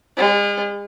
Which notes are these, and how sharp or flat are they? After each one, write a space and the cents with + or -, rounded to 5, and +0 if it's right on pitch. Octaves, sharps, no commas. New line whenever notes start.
G#3 -40